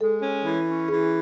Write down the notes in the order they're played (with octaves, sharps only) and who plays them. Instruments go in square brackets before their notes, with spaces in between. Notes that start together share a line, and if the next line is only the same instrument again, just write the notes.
[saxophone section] G#3 [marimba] A4
[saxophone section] C#4
E3
C#4
[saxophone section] E3 [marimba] G#4